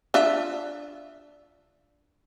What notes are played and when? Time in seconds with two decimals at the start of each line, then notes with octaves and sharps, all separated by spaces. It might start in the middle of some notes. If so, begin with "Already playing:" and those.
0.14 D4 F4 E5